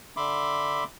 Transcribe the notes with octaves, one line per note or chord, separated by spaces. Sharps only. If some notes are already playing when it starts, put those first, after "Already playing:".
D3 E5 B5 C6 D6